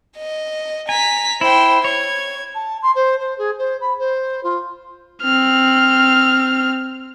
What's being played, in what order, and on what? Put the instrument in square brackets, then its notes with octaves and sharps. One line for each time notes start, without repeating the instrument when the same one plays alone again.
[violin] D#5
[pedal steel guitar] G#5 [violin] A#5 B6
[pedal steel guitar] E4 [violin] C5 G5
[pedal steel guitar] C#5 [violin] G#6
[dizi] A5
C6
C5
C5
G#4
C5
B5
C5
F4
[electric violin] C4 F6